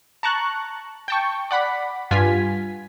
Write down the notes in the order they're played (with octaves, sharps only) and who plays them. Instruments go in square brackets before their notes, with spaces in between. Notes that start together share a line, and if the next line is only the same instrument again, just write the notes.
[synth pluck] A5 A#5 C#6 F#6
G5 A5 C#6
D5 F#5 B5
G2 F4 G#5 B6